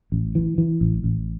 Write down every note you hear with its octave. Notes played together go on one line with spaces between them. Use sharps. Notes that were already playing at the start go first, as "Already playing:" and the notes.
A1
E3
E3
A1
A1